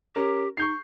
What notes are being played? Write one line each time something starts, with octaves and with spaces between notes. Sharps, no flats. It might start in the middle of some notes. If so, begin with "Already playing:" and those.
C#4 G4 A#4
D#4 C#6 G6 C7